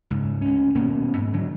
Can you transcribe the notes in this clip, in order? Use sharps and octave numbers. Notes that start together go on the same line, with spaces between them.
C#2 G#2
D2 C#4
D#1 B2 A#3 C#4
G#2
D3 F#3 D4